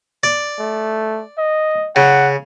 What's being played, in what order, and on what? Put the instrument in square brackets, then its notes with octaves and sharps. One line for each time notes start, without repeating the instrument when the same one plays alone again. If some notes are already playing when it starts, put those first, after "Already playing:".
[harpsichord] D5
[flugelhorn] A3
D#5
[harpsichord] C#3 [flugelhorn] F#5